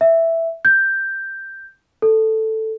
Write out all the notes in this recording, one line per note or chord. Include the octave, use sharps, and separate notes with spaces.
E5
G6
A4